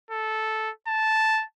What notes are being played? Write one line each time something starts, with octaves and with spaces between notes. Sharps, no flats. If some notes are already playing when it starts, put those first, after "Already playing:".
A4
A5